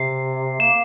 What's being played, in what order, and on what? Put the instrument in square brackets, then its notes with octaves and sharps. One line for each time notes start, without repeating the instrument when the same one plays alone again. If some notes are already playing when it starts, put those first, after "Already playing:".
Already playing: [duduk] C3 [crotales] C7
[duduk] A#3 [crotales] E7